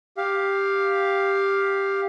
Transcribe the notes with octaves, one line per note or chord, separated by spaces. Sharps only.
G4 F5